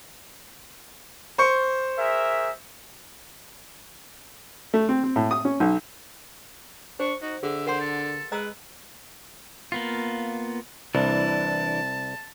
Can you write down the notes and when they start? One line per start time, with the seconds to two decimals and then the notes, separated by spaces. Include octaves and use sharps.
1.38 C5 C#6 C#7
1.97 G#4 A#4 E5
4.74 A3
4.89 C4
5.04 C4
5.16 A2
5.31 D#6
5.45 C#4
5.60 B1
7.00 D4 C5 C#6
7.22 D#4 F#4
7.43 D3 G#4 E5
7.66 A#4 C5 F#5 C6
7.80 A4
8.32 G#3 B4 D#5 A#5 E6
9.72 A#3 B3 F4
10.95 C2 E3 D4 A5